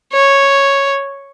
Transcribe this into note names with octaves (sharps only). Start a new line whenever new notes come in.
C#5